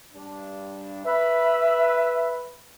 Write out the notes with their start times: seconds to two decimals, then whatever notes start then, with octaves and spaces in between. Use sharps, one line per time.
0.14 G2 D4
1.05 B4 E5